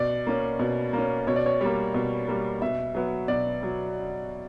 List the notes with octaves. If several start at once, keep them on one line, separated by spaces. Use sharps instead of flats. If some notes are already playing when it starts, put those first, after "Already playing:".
Already playing: B2 D5
A#3 C#4
B2
A#3 C#4
B2 C#5
D5
C#5
G3 A#3
B2
G3 A#3
B2 E5
F#3 B3
B2 D5
F#3